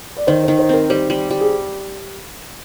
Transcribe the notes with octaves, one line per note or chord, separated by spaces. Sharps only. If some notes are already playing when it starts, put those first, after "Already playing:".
D5
D#3 C5
D#3 C5
C5
C4 A#4
G3 C5
G3
G3
G#4